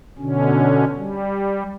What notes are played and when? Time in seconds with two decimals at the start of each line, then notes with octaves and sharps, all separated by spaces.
0.18 B2 D3 C#4
0.97 G3